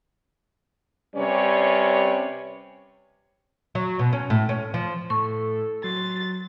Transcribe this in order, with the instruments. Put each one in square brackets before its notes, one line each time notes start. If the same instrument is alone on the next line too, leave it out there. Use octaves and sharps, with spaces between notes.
[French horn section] C3 G3 C#4 B4 C#5 D5
[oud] F#3
B2
C#4
A2
C#4
F3
[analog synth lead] A2 [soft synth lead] A4 [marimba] C#6
[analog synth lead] F#3 [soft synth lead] C6 [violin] A6